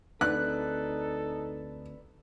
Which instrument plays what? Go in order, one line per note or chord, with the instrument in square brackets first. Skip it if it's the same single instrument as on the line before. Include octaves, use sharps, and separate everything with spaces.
[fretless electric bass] D2 C4 [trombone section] D#4 A4 [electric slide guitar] B4 D5 [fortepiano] F#6